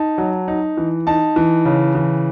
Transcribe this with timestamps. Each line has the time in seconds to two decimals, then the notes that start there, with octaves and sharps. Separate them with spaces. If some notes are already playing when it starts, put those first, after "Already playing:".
Already playing: D#4 A5
0.18 F#3
0.48 D#4
0.77 E3
1.07 D#4 A5
1.36 E3
1.65 C#3
1.95 E3